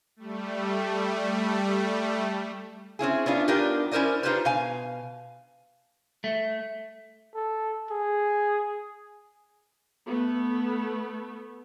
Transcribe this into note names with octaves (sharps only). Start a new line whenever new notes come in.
G3 A3
C4 C#4 E4 G#4
B3 C#4 D4 F4
B3 D4 D#4 F4 G4 A#4
C#4 E4 A#4 C5 D5 D#5
D4 D#4 F4 G4 B4 C5
B2 F5 G#5
A3
A4
G#4
A3 B3